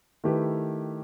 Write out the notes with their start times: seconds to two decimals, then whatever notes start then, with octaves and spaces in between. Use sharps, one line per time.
0.24 D#3 A3 E4 G4 B4